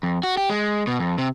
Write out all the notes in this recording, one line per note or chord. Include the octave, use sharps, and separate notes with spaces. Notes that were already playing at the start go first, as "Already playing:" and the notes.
F2
F#4
G4
G#3
B2
F2
C3